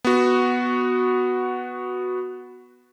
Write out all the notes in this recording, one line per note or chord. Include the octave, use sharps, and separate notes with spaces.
B3 F#4